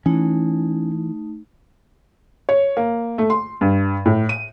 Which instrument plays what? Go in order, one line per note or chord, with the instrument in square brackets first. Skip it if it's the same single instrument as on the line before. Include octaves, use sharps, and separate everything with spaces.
[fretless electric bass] E3 [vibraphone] A3 D#4 [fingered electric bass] C#4
[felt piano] C#5
A#3
A3
C6
G2
A2
D#7